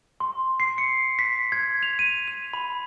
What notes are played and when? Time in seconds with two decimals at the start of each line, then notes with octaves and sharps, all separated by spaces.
0.20 C6
0.60 C7
0.78 C#7
1.19 B6
1.52 G#6
1.83 F7
1.99 D#7
2.28 F7
2.53 B5